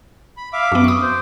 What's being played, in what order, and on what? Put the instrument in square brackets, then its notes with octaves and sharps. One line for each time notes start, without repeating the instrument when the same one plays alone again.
[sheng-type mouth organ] B5
E5 F5 D6
[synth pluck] F#2 B3 [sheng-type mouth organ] D6
[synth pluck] C#6 D#6
[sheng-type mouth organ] C5